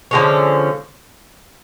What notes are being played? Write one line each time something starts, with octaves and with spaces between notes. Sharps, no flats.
D3 F3 G#3 C#4